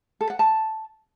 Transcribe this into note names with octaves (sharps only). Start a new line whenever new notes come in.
A4
F#5
A5